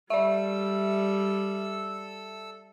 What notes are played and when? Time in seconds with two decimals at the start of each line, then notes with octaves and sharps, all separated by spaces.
0.10 G3 A4 D5 E5 E6